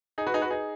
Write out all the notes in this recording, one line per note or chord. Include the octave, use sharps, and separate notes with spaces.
D#4 G#4
F#4 B4
D#4 G#4
F#4 B4
D#4 G#4